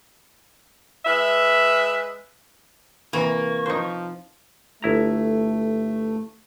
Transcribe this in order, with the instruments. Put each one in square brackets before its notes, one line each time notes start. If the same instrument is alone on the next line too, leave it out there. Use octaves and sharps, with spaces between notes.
[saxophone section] G#3 B4 E5
[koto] C3 E3 [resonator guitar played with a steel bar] A#3 [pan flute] C#6
[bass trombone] F3 [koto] D#4 C5
[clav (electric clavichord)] G1 E4 A#5 [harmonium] A3